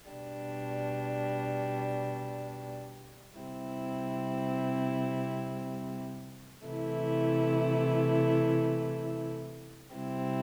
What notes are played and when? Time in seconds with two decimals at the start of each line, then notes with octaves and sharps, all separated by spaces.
0.10 B2 G3 D4
3.39 C3 G3 C4 E4
6.67 C3 E3 A3 E4
9.94 C3 G3 C4 E4